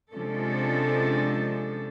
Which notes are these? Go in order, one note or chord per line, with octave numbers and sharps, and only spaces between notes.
C3 F3 G#3 C#4 D4 A4